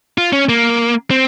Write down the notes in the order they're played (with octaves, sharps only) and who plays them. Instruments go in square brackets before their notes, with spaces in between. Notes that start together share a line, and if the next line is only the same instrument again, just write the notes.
[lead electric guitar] F4
C#4
A#3
C4